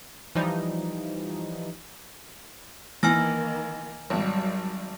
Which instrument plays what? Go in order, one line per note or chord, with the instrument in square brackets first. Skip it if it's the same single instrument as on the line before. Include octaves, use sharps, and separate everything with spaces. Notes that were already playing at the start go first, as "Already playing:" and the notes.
[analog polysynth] E3 F3 G3 D#4
[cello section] D#3 A#3 [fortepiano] E3 [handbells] G#5 F6 A#6
[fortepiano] G#1 [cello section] F#3 G3